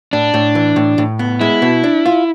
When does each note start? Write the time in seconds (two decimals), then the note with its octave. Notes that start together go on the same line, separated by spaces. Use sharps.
0.13 A2 D4
0.34 A2
0.55 E3
0.76 A2
0.98 A2
1.19 B3
1.41 G#3 E4
1.62 B2
1.84 D4
2.05 F4